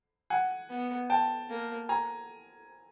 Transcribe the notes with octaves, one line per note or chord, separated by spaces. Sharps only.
F#5 G#5
B3
G5 A5
A#3
G#5 A#5